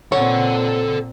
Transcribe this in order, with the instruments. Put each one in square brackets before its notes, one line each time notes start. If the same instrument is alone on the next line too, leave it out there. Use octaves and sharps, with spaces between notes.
[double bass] A#2 C4 [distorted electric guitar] A4 F#5 [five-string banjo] C#5